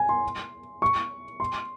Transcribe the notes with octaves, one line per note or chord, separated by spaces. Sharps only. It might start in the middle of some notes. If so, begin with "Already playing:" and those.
Already playing: G#5
C6
C#6
C6